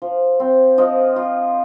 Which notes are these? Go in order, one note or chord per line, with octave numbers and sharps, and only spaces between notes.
F3
C4
F3 D#5
F4